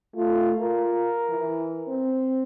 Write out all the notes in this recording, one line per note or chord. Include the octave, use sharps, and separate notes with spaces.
A3 F4
F4 A#4
E3
C4